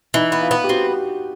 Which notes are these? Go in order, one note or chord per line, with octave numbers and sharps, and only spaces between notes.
E3 D#4
B3
F4
B3
G4
C4 F#4